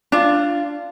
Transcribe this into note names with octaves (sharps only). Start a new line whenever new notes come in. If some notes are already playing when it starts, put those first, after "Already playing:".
D4 F4